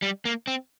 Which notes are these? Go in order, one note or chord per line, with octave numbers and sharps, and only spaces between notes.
G3
A#3
C4